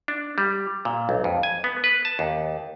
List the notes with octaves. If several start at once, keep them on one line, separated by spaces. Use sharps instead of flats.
D4
G3
A#2
B1
F2
G#5
B3
B4
A5
D#2